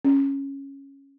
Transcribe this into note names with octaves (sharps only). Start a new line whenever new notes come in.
C#4